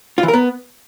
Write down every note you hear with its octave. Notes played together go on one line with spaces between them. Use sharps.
F4
E3
A#4
B3